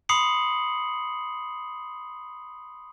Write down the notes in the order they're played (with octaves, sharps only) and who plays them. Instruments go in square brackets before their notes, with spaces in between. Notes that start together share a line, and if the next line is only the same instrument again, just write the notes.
[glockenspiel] B5 C6 D#6 C7 C#7 F#7